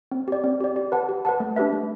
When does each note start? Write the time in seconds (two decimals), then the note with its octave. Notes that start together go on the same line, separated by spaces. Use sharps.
0.12 C4
0.28 G4 D5
0.44 C4
0.60 G4 D5
0.76 G4
0.92 B4 F#5 A5
1.09 G4
1.25 B4 F#5 A5
1.40 A3
1.56 D4 G4 B4 E5
1.73 A3